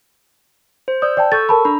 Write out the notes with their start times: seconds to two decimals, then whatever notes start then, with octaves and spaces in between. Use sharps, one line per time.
0.88 C5
1.02 D5 D#6 E6 G6
1.17 D5 G5 A5
1.32 A4 C#6 E6 G6 A6
1.49 A#4 A5 B5
1.65 D4 A#5 B5